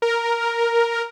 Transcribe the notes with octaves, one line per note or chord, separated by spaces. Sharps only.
A#4